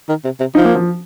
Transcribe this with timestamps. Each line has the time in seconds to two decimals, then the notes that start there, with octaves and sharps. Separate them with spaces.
0.09 D#3
0.24 C3
0.40 C3
0.55 F3 D#4
0.65 A#3
0.75 F3